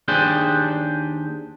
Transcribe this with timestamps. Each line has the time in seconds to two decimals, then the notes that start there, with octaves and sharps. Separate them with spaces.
0.08 D#2 D4 G4 G#4 C5